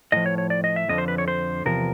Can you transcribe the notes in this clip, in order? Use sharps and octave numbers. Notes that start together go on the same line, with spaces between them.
A2 F3 D#5
C#5
C#5
D5
D#5
E5
F2 D3 F3 D#5
C5
B4
C#5
C5
E2 C3 F3 A#4